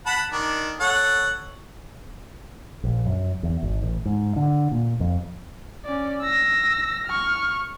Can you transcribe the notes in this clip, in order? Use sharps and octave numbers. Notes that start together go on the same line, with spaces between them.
F#5 A5 B5
D#3 D4
A4 C#5 F#5
A#1
F#2
E2
G#1
A1
G#2
D3
A#2
F2
C#4 D5
E6 A#6
C#6 F6